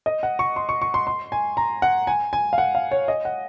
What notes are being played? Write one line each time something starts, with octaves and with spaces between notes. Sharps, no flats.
D#5
F#5
C#6
C6
C#6
C#6
C6
C6
G#5
A#5
F#5
G#5
G#5
F5
F#5
F5
C#5
D#5
F#5